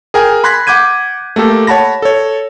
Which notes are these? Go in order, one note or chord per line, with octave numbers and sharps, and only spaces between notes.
G#4 A#4 G5 G#5
B5 C6 F#6 G#6 A#6 B6
F#5 D6 G6 G#6 D#7
A3 A#3 G4 A4
C#5 F#5 A5 B5 A#6
A4 C#5